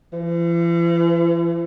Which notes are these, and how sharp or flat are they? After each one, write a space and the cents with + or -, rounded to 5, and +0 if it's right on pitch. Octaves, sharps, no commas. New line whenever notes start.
E3 +45